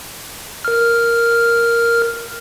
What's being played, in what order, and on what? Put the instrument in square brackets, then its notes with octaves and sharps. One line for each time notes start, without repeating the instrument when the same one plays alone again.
[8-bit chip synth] A#4 F6